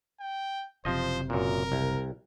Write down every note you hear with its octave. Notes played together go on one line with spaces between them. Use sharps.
G5
F#1 C3 F3 C5 D#5
F#2 A#2 A#4
C2